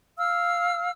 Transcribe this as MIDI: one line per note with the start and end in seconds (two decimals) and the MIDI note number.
0.18 0.90 77
0.18 0.90 88
0.18 0.90 89